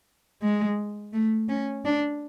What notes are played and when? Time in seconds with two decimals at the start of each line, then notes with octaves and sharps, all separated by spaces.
0.42 G#3
1.13 A3
1.49 C#4
1.85 D4